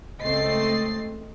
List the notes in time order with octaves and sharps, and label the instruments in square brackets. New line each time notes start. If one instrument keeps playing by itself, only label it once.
[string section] C#2 A3 C4 D#5 A6 C7